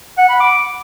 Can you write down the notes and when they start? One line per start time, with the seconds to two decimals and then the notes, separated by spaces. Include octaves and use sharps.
0.18 F#5
0.29 B5
0.40 D6